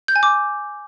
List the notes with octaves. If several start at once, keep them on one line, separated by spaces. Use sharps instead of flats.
G6
G#5
D6